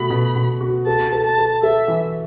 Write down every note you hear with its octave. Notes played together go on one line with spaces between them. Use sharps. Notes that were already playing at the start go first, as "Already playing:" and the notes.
Already playing: B2 A3 F#4 B5
B2
B2
F#4
A4 A5
A4
A5
A4
A4 E5
E3